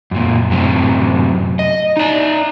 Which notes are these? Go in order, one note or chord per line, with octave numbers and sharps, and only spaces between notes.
F#2 A#2
F#2 A2 C3 F#3
D#5
D#4 D5